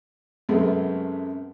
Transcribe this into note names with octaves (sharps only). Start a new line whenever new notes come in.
F#2 C3 G#3 A3 B3